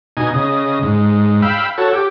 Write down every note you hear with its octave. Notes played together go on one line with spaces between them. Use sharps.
B2 D#4 G#5
C#3 D#5
G#2
F5 G5 B5 E6
F#4 A4 C#5
G4